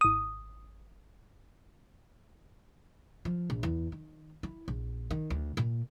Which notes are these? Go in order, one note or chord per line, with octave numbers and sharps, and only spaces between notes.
G#1 D#6
F3
A#1
E2
D#3
E4
A#1
D#3
D2
A#2